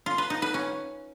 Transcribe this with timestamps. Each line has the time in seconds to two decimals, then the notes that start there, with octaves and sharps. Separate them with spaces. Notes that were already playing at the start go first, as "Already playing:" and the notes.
0.06 F4
0.18 B4
0.30 D#4
0.42 B4
0.54 C#4